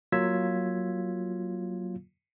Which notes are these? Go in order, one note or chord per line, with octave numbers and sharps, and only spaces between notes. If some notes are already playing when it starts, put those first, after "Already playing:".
F#3 A#3 F4 E6 G#6 B6